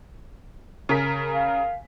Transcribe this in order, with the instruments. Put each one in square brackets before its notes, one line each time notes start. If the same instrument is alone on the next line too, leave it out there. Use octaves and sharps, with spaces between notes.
[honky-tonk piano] C#3 A#4 B6
[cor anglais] F5